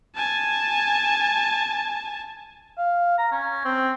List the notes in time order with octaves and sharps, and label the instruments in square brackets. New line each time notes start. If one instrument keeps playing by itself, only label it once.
[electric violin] G#5 A5
[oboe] F5
A#5
C#4
C4